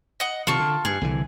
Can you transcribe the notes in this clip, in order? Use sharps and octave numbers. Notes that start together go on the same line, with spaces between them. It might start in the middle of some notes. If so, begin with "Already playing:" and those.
D#5 F#5
C3 D#3 F4 A5 C#6
D3
G2 G#4
C2 D3 E3